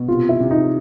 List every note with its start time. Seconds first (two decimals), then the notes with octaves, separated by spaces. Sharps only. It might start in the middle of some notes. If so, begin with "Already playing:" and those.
Already playing: B2
0.08 C3 F4
0.29 E4
0.40 C3
0.51 D#4